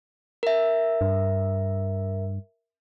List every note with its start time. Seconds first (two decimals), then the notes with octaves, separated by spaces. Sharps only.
0.43 A#4 E5
1.01 G2